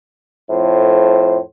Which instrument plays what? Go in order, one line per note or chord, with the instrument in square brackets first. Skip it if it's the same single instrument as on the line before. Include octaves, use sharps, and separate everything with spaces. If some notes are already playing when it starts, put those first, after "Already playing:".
[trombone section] F2 A2 C5